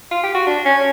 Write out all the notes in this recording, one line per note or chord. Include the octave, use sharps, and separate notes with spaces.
F4
G4
F#4
D4
C#4